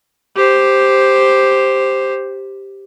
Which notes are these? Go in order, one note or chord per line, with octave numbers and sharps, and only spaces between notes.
G4 C5